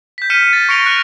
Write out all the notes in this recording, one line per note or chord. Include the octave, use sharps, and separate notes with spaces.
G6 B6
F6 G6 B6 C#7 D#7 E7
A6
C#6 A#6 C#7 D7 F7 G7
F#6